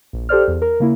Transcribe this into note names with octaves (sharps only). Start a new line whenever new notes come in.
A#1
G4 A4 C5 D5 F6
E2
A#4
C#3 A#3 E4